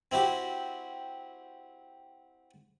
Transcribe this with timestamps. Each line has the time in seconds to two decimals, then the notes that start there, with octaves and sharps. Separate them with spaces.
0.12 C4 E4 F#4 G4